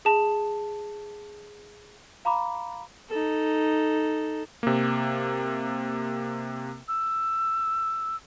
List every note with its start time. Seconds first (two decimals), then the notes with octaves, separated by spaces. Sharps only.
0.05 G#4 A5
2.25 F5 A#5 B5 D6
3.10 D#4 A4
4.63 C3 A#3
6.88 E6